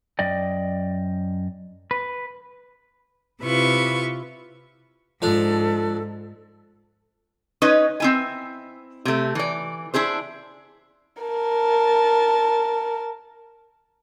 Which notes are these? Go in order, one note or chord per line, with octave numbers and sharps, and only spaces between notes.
F#2 D5 D#5 G5
B4
C3 E4 F4 B4 C#6
G#2 F3 D4 A4
C#4 D#4 B4 D#5
C4 E4 G#5
C3 A3
E3 D5
D4 E4 G#4 C5
A#4 A5